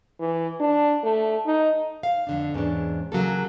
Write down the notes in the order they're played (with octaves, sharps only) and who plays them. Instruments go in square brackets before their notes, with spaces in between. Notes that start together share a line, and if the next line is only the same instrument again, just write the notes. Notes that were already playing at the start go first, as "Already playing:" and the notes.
[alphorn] E3
D4
A3
D#4
[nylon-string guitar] F5
F2 D3 D4
E2 G#2 C#4 D4
C#3 F#3 A#3 A4